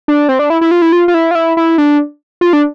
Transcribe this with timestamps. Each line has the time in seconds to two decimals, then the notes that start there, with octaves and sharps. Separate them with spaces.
0.08 D4
0.29 C4
0.39 D4
0.50 E4
0.61 E4
0.71 F4
0.82 E4
0.92 F4
1.08 F4
1.14 E4
1.31 F4
1.35 E4
1.57 E4
1.78 D4
2.41 F4
2.53 D4